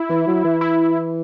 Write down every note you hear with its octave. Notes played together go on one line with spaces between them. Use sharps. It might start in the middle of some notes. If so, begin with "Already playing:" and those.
Already playing: E4
E3
F#3
E3
E4